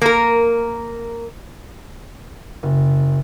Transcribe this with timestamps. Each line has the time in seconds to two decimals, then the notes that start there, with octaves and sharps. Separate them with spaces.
0.01 A#3 A#4
2.63 F#1